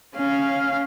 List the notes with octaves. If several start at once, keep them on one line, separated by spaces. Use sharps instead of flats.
C#4 F5